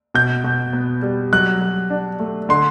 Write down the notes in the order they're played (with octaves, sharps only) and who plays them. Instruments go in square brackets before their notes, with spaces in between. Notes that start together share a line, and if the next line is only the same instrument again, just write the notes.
[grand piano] B2 G6
B2
B3
G3
F#3 F#6
F#3
D4
A3
D3 C6